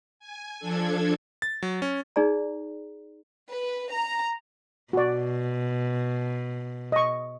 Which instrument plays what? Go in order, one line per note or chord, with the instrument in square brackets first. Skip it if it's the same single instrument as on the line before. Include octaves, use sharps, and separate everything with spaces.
[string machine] G#5
F3 D4 A4 G#6
[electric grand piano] A6
F#3
C#4
[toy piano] D#4 G#4 D5 A#5
[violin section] B4
A#5
[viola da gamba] B2 [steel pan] F#4 D5
[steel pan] D#5 C#6